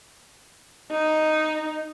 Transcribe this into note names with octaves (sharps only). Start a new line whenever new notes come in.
D#4